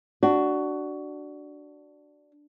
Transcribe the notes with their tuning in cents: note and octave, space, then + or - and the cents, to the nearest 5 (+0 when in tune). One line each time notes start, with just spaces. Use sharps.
D4 +0 F#4 +15